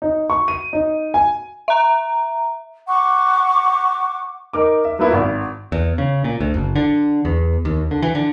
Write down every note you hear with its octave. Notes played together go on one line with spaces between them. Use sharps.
D#4
C#6
D#7
D#4
G#5
E5 A#5
F#5 C#6 D6
D#4 A#4 D6
E5
F#3 A#3 B3 E4 F4 A#4
G#1
E2
C#3
A#2
D2
F#1
D3
E2
D#2
D3
E3
D3